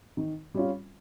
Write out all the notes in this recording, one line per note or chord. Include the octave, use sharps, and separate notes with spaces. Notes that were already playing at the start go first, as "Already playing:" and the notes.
D#3
G3 C#4 F4